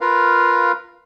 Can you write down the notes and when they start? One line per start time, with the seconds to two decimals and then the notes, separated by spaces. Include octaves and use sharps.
0.01 F4 A#4 B4 F5